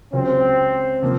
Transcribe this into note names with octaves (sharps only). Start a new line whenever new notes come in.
C#2 C#3 F#3 C4 C#4 F#4
C3 F3 A#3